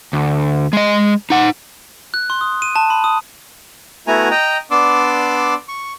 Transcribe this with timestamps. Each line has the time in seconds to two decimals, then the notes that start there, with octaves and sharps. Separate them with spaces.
0.13 D2
0.73 G#3 D#5
1.30 D#4 F#5
2.14 F#6
2.30 C6
2.41 D#6
2.62 D#7
2.76 A5
2.90 B5
3.04 D#6
4.07 A3 B3 E4 F#4 G#5 A#5
4.31 D#5 G5 A#5
4.71 B3 D4 D5 C6 D6 E6
5.69 C#6